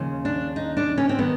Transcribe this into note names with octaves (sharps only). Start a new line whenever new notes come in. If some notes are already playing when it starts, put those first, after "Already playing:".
Already playing: D#2 C#3 F3
D4
D#4
D4
C#4
C4
D#3 B3